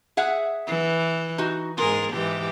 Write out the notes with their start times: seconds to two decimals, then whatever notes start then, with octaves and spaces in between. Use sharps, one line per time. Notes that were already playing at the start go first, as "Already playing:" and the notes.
0.17 G#4 E5 F#5
0.67 E3
1.38 D#4 F#4
1.78 G#2 F4 G#4 A#4
2.12 G#2 E3 G4